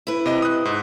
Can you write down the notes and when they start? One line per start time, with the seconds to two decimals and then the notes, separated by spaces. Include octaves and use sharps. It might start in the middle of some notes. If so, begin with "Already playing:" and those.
0.07 E4 B4
0.26 C3 D#5
0.42 D#6 F#6
0.65 G#2